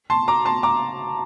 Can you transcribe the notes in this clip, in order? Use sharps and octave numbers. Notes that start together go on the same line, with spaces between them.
A5 C6
A#5 D6
A5 C6
A#5 D6